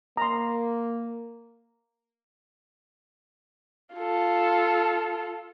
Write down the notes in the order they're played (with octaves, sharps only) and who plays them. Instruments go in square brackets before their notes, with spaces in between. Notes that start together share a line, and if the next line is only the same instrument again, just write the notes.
[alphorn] A#3 [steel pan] A#5 C6
[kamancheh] F4 A4